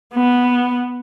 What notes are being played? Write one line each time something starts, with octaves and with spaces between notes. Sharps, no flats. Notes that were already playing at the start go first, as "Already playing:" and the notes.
B3